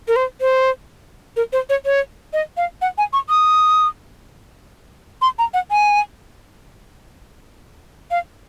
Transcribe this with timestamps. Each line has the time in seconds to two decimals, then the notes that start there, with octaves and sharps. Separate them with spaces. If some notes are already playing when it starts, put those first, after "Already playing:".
0.08 A#4
0.16 C5
0.41 C5
1.36 A#4
1.53 C5
1.70 C#5
1.85 C#5
2.33 D#5
2.57 F5
2.82 F#5
2.98 G#5
3.13 C#6
3.29 D#6
5.22 C6
5.39 A#5
5.54 F#5
5.71 G#5
8.11 F5